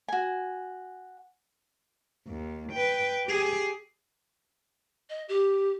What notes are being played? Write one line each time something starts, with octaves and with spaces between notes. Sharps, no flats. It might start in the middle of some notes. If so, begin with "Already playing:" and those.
F#4 G#5
D#2
B4 G5
G4 G#4
D#5
G4